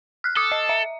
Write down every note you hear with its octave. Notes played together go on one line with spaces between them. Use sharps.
F6 F#6
A4 D6 D#6
D#5
E5